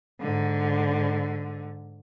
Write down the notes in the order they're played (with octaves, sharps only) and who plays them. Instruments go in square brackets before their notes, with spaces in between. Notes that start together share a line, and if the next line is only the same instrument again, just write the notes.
[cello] G#2 D3